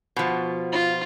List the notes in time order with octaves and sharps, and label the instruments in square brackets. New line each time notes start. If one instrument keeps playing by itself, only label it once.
[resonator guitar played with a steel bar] B2 F3
[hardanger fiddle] F4